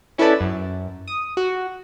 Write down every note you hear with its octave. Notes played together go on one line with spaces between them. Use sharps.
C#4 E4 A4 B4 D5 A5
F#2
D#6
F#4